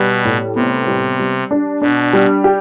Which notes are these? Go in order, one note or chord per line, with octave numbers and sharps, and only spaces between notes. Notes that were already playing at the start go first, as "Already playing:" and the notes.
Already playing: B2 G3 B4
A2
C3 B3
G3
G3
D4
B2 D4
G3
G4